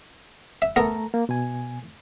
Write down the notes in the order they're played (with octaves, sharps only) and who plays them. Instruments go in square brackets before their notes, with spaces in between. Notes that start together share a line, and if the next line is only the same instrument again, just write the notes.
[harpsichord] E5
[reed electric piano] A3 A4 A#5 [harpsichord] B3 A#4
[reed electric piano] A#3
B2 G#5